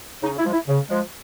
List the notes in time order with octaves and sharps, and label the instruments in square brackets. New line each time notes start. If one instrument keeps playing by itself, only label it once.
[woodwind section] C#3 D#4
E4
F3 G#3
E4
C#3
F3 G#3